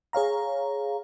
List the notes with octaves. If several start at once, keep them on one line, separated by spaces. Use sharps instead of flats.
G#4 C#5 F5 A#5